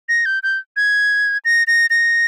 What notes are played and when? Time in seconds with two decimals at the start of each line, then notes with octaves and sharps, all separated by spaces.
0.09 A#6
0.26 G6
0.43 G6
0.77 G#6
1.45 A#6
1.67 A#6
1.90 A#6